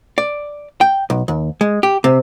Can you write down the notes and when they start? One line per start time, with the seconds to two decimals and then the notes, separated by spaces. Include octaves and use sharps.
0.18 D5
0.81 G5
1.10 B1
1.28 D#2
1.61 G#3
1.83 G4
2.04 C3